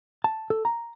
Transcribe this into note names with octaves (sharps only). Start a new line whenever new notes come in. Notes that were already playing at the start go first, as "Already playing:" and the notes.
A5
A4
A#5